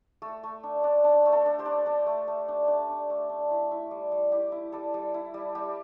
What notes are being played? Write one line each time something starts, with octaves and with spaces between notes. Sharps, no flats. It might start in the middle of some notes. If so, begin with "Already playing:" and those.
A3 A4
A3
D4
D4
D4 A4
A3
A4
D4
G4 C5
D4
D4 A4
A3
A3
D4
D4
D4
A3
D4
E4
E4
G3
G3
E4 G4
E4
G3 A4
G3
E4
G3
G3 G4